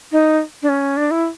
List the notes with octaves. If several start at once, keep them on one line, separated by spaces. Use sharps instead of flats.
D#4
D4
C#4
D4
E4